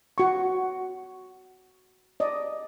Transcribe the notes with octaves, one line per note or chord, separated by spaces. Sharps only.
F#4 C#6
D5 D#5